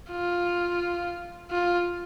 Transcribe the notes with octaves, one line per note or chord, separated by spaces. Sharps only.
F4
F4